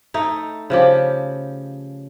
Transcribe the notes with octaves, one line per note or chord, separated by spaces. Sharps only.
A3 D#4
C#3 F3 G4